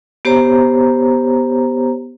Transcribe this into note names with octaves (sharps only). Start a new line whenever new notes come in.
B3 G4 C5 C#5 A#5